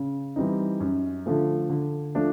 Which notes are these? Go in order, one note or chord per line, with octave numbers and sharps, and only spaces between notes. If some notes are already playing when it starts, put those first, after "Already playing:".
Already playing: C#3
E3 G3 C4 D#4
F#2
D3 F3 A3
D3
F3 A3 D4